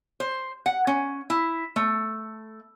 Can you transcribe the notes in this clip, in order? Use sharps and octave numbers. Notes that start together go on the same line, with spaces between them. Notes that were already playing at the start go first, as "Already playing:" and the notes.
C5
F#5
C#4
E4
A3